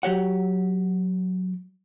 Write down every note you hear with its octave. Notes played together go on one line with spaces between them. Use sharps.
F#3 G4 C#5 F#5